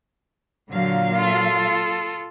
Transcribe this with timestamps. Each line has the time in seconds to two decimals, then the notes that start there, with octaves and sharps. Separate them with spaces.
0.70 A#2 D3 F#3 F5
1.15 F4 A4